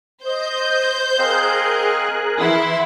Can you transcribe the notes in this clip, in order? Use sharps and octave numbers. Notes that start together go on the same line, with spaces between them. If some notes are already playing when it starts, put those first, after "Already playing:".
C5 D#5 G6
C4 G#4 A#4 D#5 F5 F#6
E3 E4 F#5 C6